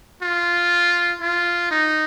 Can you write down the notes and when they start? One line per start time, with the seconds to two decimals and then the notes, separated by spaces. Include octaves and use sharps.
0.23 F4
1.22 F4
1.71 D#4